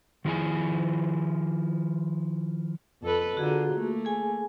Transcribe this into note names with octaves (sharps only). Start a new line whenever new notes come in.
D#3 F3 E4 G#4 G#5
F2 A4 B4
D3 F4 F#4 G#4 A#5
A3 A#3
G#4 G#5